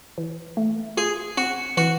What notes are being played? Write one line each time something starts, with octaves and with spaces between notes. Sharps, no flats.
E3
A3
F4 G#4
C4 F#4
E3 F#4